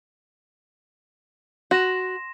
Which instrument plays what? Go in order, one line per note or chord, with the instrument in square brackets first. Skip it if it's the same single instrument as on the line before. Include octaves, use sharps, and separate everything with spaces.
[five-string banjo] F#4 [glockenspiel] C6 A#6 E7